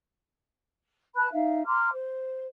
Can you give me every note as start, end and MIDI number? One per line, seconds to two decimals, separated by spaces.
1.16 1.27 71
1.16 1.27 81
1.16 1.27 83
1.16 1.27 90
1.32 1.62 63
1.32 1.62 76
1.32 1.62 77
1.65 1.88 82
1.65 1.88 84
1.65 1.88 86
1.65 1.88 89
1.92 2.46 72